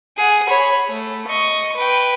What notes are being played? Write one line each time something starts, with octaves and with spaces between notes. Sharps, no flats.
G#4 F#5
C#5 B5
A3
D#5 C#6
B4 G5